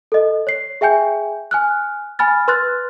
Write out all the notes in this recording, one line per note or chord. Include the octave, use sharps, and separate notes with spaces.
A4 D#5
C#5 C7
G#4 E5 G5 G#5 G6
G#5 F6 F#6
G#5 B5 F6 A6
B4 C6 F6 F#6 A6